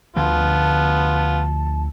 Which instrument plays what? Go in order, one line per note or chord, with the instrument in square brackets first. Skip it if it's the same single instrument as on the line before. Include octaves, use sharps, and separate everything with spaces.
[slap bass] D2 D3 F3 [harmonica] B3 F4 [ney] A5